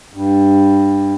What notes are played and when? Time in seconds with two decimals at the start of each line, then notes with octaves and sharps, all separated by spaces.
0.14 G2